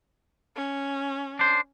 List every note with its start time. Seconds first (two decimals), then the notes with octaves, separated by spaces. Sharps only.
0.56 C#4
1.39 D4 C5